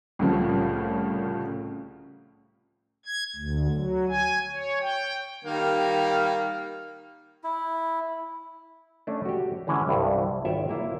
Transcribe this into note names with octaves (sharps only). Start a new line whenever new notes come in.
C2 A2 C#3 F3
G#6
D2
F#3
G#5
C#5
G5
D#3 G3 A#3
E4
A3 C#4 D4
F#4 G4
D3 E3 G#3 C#4 E4
C2 G2
G#1 F4 C#5 E5 G5
A#3 E4 F4 C5